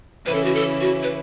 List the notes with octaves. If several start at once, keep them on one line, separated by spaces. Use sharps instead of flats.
C#3 E3 C#4 E4 B4
A4
F#4
A4
F#4
B4